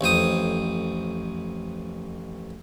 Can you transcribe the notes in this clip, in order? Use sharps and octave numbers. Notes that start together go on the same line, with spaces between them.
A1 F2 C5 D#6